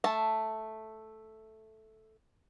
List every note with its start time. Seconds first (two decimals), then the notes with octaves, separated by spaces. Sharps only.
0.04 A3 A5